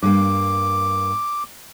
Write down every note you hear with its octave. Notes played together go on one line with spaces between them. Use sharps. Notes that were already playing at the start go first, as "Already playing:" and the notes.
G2 A#3 D6